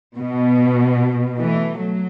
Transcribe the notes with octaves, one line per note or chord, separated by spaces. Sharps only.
B2
E3 A3
F#3